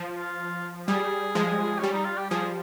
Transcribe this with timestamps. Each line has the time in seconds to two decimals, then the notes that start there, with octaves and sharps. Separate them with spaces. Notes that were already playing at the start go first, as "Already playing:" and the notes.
Already playing: F3
0.17 F4
0.88 G3 G#4
1.35 F3 G#3
1.79 G3 C#4
1.93 D#4
2.05 F4
2.18 G4
2.30 F3 G#4